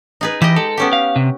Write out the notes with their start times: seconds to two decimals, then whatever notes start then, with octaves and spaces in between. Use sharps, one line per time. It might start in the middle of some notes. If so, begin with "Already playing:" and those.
0.21 D#4 G#4 B4
0.42 E3 G4 D#5
0.56 G#3 A4
0.77 B3 C#4 G4
0.93 F5
1.16 C3